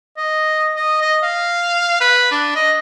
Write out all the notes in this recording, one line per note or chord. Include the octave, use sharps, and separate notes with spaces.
D#5
D#5
D#5
F5
B4
D4
D#5